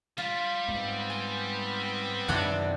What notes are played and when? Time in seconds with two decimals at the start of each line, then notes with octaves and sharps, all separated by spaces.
0.18 G3 F4
0.68 G#2 B3 C4
1.10 G#5
2.28 F#2 C3 D#3 F#3 D4 F#5